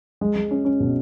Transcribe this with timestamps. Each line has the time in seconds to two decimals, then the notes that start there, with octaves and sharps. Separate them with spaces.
0.21 G#3
0.35 G#3
0.51 C#4
0.65 C#4
0.80 B2